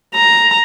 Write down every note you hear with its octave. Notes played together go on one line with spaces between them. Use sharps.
A#5